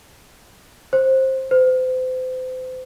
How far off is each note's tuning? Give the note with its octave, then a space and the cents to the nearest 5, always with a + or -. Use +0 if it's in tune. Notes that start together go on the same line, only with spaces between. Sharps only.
C5 +15
C5 -35